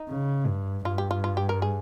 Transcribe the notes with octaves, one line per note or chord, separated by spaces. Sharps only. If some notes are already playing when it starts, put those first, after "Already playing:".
Already playing: D#4
C#3
G2
G2 F4
G4
F4
F4
G4
A#4
G#4